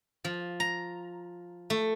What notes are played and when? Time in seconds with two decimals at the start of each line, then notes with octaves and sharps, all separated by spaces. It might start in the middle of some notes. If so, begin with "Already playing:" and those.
0.24 F3
0.60 A#5
1.70 A3